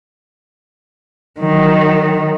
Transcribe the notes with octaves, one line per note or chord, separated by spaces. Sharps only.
D#3 F#3